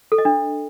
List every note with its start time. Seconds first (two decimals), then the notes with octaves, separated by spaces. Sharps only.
0.12 A4
0.18 D#5
0.25 D4